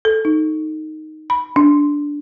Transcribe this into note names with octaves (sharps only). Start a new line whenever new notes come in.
A4
D#4
B5
D4